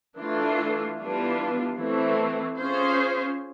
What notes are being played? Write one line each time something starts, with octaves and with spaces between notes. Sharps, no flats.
E3 A3 D4 F4
E3 G3 B3 D4 F4
E3 A3 C4
C#4 F4 G#4 C5